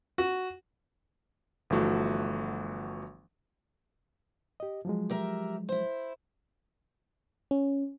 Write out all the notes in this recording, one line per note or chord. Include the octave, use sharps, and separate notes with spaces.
F#4
G1 E3 F3 A3 F#4
G4 D#5
F3 F#3 G#3
G4 A#4 E5
E4 C5
C#4